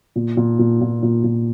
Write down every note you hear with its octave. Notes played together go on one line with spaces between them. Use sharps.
A#2
A#2
A#2
A#2
A#2
A#2